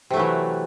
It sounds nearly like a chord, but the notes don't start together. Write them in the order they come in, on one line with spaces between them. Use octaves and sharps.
C3 A3 F#3 E3